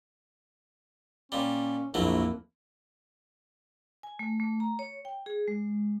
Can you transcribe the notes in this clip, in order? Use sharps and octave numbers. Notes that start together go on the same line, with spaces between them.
A#2 G3 C#4
A#1 F2 F#3 A3 A#3 E4
G#5
A3
A3
A#5
C#5
G5
G#4
G#3